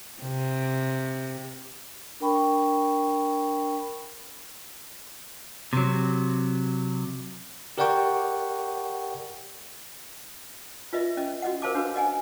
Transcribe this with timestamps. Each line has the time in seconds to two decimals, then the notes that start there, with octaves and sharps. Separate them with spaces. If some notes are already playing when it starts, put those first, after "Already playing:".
0.22 C3
2.20 D4 A#4 G5 B5 C#6
5.73 C3 F#3
7.78 G4 A#4 D5 F#5 G5 C#6
10.93 F4 B4 D#5 E5
11.17 C#4 D#5
11.42 F#4 D#5 F#5
11.62 A#4 C5 F5 A5 D6
11.75 D4 F#4 B4
11.96 D#5 F#5 G#5